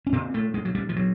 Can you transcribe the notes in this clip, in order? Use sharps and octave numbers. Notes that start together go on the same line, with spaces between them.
C#4
A#2 C4
A3
G#3
F#3
G3
F3
F#3